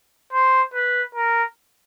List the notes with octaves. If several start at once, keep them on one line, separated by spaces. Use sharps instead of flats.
C5
B4
A#4